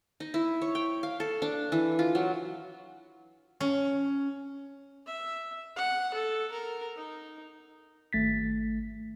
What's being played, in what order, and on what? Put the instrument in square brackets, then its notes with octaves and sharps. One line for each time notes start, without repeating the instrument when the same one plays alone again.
[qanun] D#4
E4
C#5
G5
F5
A4
D4
E3
F4
F#3
[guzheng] C#4
[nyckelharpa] E5
F#5
A4
A#4
D#4
[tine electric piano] G#1 A3 A6 B6